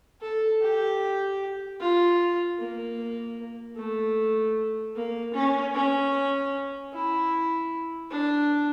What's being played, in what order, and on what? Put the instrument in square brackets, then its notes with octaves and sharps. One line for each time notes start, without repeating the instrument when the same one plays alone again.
[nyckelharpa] A4
G4
F4
A#3
A3
A#3
C#4
C#4
E4
D4